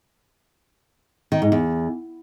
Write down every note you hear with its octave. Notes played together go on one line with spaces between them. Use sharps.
D#3
G#2
E2